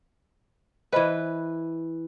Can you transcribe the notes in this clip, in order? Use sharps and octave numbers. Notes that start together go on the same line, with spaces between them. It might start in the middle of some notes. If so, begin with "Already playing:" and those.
E3 B4 C5 D#5 B5